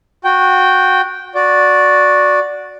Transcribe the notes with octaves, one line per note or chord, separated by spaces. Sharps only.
F#4 G5
F#4 D5